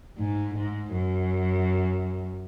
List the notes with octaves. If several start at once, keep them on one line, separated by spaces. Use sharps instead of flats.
G#2
G#2
F#2